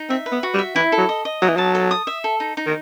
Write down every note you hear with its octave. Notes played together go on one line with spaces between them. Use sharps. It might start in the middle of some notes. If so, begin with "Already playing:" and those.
Already playing: D#4
C4 E5
B4
B3
F#4
G3
E5
E3 E4
A4
F#3
D#5
D#5
F#3 D#6
E3
F#3 A5
A4
D#6
E5
A4
D#4
D#4
D#3